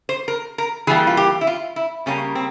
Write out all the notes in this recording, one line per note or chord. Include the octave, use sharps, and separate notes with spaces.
C5
A#4
A#4
E3 G3 A#3 G#4
F4
G4
E4
F4
E4
C#3 G3 A#3 C#4
C4